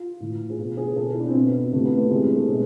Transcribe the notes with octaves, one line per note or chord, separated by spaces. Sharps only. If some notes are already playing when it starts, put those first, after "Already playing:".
Already playing: F4
A2 E3
G#4
B2 F4
G#4
B2 A4
E4
D4
C4
B2 B3
C3 E3 A3
B3
A3
C3 E3 G#3
A3
A3
B2 G#3